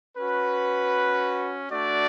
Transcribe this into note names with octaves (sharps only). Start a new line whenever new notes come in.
C#4 F#4 B4
A3 D4 F#4 D5